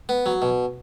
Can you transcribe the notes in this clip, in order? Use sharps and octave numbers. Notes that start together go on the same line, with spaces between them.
B3
F#3
B2